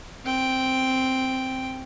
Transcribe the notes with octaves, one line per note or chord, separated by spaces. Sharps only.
C4 G5